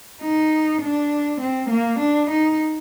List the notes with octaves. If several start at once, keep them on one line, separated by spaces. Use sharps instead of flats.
D#4
D4
C4
A#3
D4
D#4